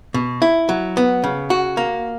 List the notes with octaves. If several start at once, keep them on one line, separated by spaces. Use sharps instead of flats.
B2
E4
F#3
B3
C#3
F#4
A#3